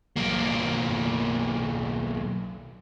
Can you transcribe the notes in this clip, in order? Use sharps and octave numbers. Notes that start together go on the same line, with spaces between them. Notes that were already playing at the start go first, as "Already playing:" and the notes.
B1 A#3